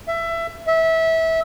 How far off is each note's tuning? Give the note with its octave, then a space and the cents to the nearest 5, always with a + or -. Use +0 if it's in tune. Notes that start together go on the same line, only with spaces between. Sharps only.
E5 +20
E5 -20